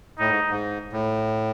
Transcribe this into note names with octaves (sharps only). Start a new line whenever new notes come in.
A2 D#4
G#2
G#2
A2